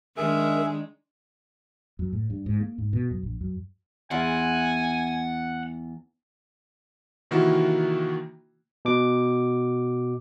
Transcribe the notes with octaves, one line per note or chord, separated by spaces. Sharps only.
D#3 G#3 D4 G#4 A#4 E5
F#2
A2
G2
G#2
A#3
G#2
B2
F#2
A#1
F#2
E2 F#5 G#5 C6
C3 D#3 E3 A#3 E4 F#4
B2 D6